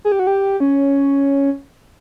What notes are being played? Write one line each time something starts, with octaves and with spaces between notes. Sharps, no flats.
G#4
G4
F#4
G4
C#4